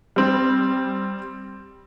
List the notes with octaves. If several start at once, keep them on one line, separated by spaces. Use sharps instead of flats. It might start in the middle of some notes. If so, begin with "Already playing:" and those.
G3 C4